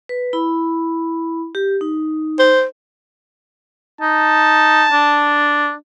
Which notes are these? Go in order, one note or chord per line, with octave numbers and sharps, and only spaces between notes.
B4
E4 B5
G4
D#4
C5
D#4 A5
D4